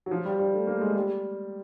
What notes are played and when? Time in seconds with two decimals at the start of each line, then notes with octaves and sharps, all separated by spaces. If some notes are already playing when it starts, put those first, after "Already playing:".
0.06 F#3
0.11 F3
0.25 G3
0.40 G3
0.54 A3
0.67 A#3
0.81 G#3
0.96 G3